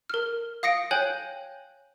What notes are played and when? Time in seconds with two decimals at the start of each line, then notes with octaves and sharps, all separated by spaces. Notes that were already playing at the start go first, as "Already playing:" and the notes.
0.10 A#4 F6
0.63 F5 D#6 A#6 C#7 D7
0.91 C#5 G5 G#5 F#6 G6 F#7